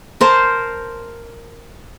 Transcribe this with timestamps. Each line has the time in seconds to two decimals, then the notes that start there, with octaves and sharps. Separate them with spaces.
0.21 A#4 C5 A5